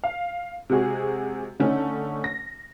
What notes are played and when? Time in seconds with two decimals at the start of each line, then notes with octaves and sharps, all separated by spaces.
0.04 F5
0.70 C3 G#3 F#4 G#4
1.60 D3 A3 C#4 D#4
2.24 A#6